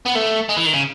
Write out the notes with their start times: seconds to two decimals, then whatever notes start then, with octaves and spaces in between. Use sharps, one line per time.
0.05 B3
0.15 A3
0.49 G#3
0.57 E3
0.66 D#3
0.74 C#3